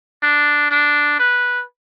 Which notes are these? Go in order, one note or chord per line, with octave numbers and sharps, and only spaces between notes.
D4
D4
B4